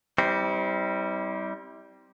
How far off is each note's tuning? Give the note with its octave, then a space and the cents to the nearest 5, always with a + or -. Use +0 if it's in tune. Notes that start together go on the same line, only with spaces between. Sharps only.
G3 -5 C4 +0 E4 -40